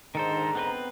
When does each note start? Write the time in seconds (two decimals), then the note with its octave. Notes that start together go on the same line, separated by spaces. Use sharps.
0.15 G#2 D3 D#3 A4 C5 A#5
0.55 B3 C4 B4